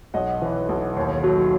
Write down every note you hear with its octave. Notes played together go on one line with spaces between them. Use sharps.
B1 D#5 F#5
E3
B1
D#2
F#3